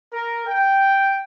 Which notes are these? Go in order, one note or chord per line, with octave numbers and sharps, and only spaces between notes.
A#4
G5